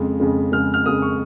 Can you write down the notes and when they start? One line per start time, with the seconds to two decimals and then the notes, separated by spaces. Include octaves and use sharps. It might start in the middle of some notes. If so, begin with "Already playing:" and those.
Already playing: F2 C#3 G#3
0.20 F2 C#3 G#3
0.52 F2 C#3 G#3 F6
0.74 F6
0.85 F2 C#3 G#3 D#6
1.02 C#6